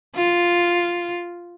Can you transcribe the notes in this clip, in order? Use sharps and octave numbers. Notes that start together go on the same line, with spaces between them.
F4